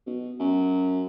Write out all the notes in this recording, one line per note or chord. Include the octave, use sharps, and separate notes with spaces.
B2
F#2